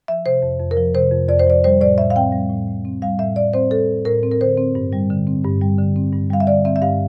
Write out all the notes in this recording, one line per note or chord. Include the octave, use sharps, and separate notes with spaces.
F3 E5
C3 C5
F2
F2
A#4
F3
C3 C5
F2
F2 D5
C5
F3 D5
G3 C5
A2 D5
A2 E5
F5
C4 G5
G3
A2
A2
C4
G3 F5
A2 E5
A2 D5
C4 C5
G3 A4
A2
A2 A#4
C4
A#4
D3 C5
C4
G2
G3
D3
C4
G2
G3
D3
C4
G2
G3 F5
E5
D3 D5
C4 E5
E5
G2 F5